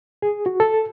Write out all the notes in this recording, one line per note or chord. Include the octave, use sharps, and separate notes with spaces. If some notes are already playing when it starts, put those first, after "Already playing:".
G#4
F#4
A4